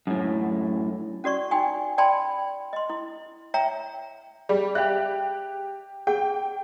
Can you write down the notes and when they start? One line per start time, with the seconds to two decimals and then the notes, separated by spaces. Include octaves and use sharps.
0.07 F#2 A2
1.24 C#4 F#4 D5 C#6
1.51 D#4 F#4 G5 G#5
1.98 D5 G5 A5 B5 C6
2.73 D#5 C6
2.90 E4
3.54 C#5 E5 G5 A#5
4.49 G3 G#4
4.75 G4 E5 F5 F#6
6.07 G#4 F#5 G5